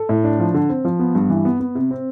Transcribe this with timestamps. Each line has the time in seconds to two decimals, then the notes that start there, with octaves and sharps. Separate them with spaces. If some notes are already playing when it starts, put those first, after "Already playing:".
Already playing: A4
0.09 A2
0.24 D4
0.39 F3
0.54 D3
0.69 C4
0.85 F3
0.99 B3
1.15 G2
1.30 E3
1.45 B3
1.60 B3
1.75 C3
1.91 C4